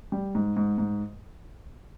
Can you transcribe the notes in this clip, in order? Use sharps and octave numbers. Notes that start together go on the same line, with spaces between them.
G3
G#2
G#2
G#2